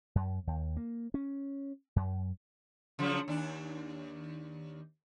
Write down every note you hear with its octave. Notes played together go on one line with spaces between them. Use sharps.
F#2
D#2
A#3
C#4
F#2
C#3 F3 F#3
D#2 D4